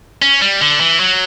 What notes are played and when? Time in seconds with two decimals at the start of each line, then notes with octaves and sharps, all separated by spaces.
0.22 C#4
0.42 G3
0.61 D3
0.80 E3
1.00 F#3